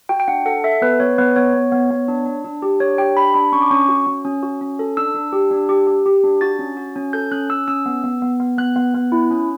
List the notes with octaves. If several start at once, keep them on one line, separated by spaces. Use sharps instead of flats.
F#4 G5
G5
D4 F#5
A4 F#5
A4 E5
B3 B4
B3 C#5
B3 B4
B3 C#5
B3
B3
B3
D4
D4
D4
G4
D4 C#5
G4 G5
D4 B5
D4 B5
C#4 C#6
D6
C#4 C#6
F#4
C#4
C#4
F#4
C#4
A4
D4 E6
D4
G4
D4
G4
G4
G4
D4
F#4 A6
C#4
F#4
C#4
A4 G6
C#4 F#6
C#4 E6
C#4 E6
B3
B3
B3
B3
B3 F#6
B3
B3
E4
C#4